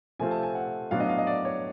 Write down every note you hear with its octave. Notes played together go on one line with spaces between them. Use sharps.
C3 F3 A3 C4 F4 G#5
A5
G#5
F#5
A2 F#3 B3 D4 F5
D#5
F5
D#5
D5
C#5